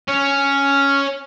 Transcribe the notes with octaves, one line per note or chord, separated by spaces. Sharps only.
C#4